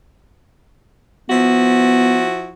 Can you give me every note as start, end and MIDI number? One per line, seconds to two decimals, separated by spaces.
1.30 2.52 53
1.30 2.25 59
1.30 2.52 64
1.30 2.52 66